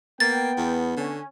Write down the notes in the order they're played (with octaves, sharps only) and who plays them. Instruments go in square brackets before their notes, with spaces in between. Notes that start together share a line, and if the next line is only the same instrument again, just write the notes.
[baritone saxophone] A#3 [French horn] B3 [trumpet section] G5 [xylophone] A6
[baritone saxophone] E2
[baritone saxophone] D3 [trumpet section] C#4